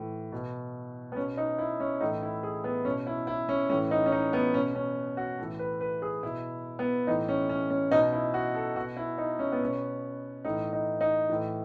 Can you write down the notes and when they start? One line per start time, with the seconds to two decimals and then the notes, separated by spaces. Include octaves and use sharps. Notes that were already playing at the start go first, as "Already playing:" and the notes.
Already playing: A2 E3
0.32 B2
1.12 B3
1.16 B2 C#4
1.37 D#4
1.58 E4
1.80 C#4
2.01 A2 E3 D#4
2.23 E4
2.43 G#4
2.64 B3
2.85 B2 C#4
3.07 E4
3.27 E4
3.49 C#4
3.70 A2 E3 C#4
3.91 D#4
4.06 C#4
4.12 D#4
4.33 B3
4.54 B2 C#4
4.75 C#4
5.17 F#4
5.39 A2 E3 A4
5.59 B4
5.81 B4
6.02 G#4
6.23 B2 E4
6.79 B3
7.07 A2 E3 D#4
7.28 C#4
7.50 C#4
7.70 C#4
7.91 B2 D#4
8.12 E4
8.34 F#4
8.55 A4
8.76 B2 F#4
8.97 E4
9.18 D#4
9.39 C#4
9.52 B3
9.60 B2 C#4
10.45 A2 E3 D#4
10.73 D#4
11.01 D#4
11.29 A2 E3